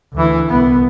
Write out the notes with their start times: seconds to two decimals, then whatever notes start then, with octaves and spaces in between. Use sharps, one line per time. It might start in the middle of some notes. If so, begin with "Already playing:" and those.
0.13 D2 E3
0.49 C2 B3